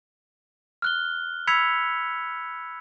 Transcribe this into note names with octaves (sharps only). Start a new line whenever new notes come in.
F6 F#6 G7
B5 E6 G#6 B6 C#7 F7